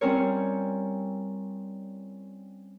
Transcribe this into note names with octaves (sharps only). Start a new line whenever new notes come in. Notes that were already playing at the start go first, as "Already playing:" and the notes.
G3 C4 C#4 E4 A#4 C#5